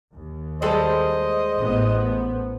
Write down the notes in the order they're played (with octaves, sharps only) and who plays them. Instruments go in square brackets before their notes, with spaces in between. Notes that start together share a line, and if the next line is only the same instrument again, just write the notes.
[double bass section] D#2
[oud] G3 G#3 A4 [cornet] C5 [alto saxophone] D#5
[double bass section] A1 A2 B3